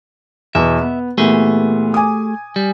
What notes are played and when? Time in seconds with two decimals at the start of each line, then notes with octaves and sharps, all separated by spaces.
0.55 E2 B2 E5
0.81 B3
1.18 A#2 E3 A3 B3 G4 G#4
1.94 G#5 D6 D#6
2.56 G3